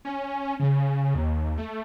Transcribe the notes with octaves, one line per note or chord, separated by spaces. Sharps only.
C#4
C#3
D#2
A3